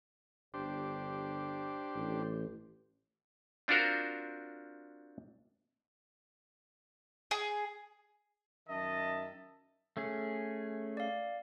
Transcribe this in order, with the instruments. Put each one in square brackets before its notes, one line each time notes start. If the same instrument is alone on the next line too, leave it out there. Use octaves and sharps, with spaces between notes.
[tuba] G1 [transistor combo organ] D4 G4 C5
[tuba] A1
[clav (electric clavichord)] C4 D4 F4 F#4 A#4 C5
[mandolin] G#4
[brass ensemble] F#2 D#3 A5 [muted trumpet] D#5 [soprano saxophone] E5
[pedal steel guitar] A3 C#4 G#4
[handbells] D5 F5